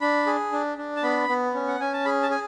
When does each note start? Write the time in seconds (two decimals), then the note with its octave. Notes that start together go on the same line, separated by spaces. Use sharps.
0.01 D4 B5
0.27 G#4
0.52 D4
0.78 D4
0.96 A5
1.03 B3 B5
1.29 B3
1.54 C#4
1.68 F#5
1.80 C#4 G#5
1.93 A5
2.05 G#4 B5
2.23 A5
2.30 G#4 G#5